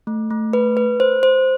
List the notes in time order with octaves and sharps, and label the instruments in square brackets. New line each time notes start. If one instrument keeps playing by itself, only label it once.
[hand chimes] A3
A3
B4
B4
C5
C5